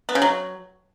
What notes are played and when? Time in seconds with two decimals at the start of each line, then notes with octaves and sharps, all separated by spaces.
0.09 B3
0.15 C#3
0.22 F#3